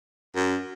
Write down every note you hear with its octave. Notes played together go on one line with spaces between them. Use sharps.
F#2